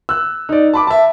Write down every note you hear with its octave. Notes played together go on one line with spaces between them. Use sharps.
E6 F#6
D#4 D5
A5 B5 D6
E5 A5